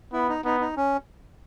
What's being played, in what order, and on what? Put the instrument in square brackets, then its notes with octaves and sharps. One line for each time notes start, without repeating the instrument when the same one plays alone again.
[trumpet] B3 [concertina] E4
[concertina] D#4
[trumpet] B3 [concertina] D#4
[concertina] D#4
C#4